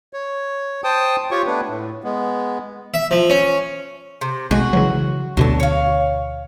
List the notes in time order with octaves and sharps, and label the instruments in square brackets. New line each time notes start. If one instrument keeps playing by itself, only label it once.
[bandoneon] C#5
C5 G5 A5 D#6
F4 G4 C#5 C#6
A3 B3 D4 B4
A2
G#3 B3
[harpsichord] E5
F3
C#4
[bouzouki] C3
[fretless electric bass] B1 G#3 [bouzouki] F#4
[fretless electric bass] C#3 E3 F#3
[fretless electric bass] D2 B2 D3 [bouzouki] F#3 A5
[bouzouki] C#5 F5